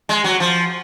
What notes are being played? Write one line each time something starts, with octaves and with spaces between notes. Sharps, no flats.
G#3
F#3
F3